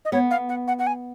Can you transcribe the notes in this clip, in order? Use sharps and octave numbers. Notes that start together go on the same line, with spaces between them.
D#5
B3 C#5
F5
F#5
F#5
F#5
G#5